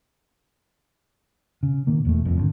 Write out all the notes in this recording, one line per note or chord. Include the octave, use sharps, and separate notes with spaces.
C#3
A#2 D#3 A#3
E1 E2 A#2 A3
E1 C2 F2 A#2
G#1 B2 D3